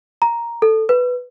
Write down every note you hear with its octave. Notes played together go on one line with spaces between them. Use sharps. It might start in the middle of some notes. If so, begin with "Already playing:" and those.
A#5
A4
B4